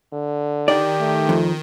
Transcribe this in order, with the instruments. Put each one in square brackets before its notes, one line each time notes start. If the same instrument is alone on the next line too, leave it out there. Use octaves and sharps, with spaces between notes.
[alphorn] D3
[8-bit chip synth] D#3 [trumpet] G4 [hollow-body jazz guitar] D5
[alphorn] A3
[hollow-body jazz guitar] F2